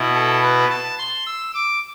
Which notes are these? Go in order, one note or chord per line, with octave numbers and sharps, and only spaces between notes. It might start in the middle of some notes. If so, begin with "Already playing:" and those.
Already playing: B2 B3 E4
A4
B4
A5
C6
E6
D6